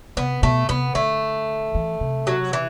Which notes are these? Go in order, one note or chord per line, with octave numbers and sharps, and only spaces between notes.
C3 B3
B2 A3
C3 B3
D3 A3
E3
C3
F#3
E3